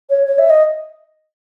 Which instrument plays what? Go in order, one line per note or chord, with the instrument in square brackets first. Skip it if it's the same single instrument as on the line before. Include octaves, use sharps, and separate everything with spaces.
[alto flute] C#5
C#5
E5
D#5